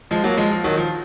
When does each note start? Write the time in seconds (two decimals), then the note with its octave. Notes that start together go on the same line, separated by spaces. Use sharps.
0.11 F3 G#3
0.24 F#3 A#3
0.37 F3 G#3
0.51 F3
0.64 D#3 F#3
0.77 F3